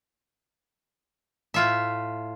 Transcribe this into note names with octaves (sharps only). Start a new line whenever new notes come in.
A2 F4 E5